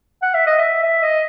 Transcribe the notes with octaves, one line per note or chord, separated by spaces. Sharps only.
F#5
E5
D#5
E5
E5
D#5